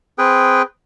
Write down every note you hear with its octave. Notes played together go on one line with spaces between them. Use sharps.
C4 G#4 B4 G5